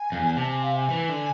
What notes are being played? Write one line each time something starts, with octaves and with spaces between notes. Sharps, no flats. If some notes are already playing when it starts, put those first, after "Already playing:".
Already playing: G#5
F2
E2
C3 A5
G#5
F5
G#5
E3
D3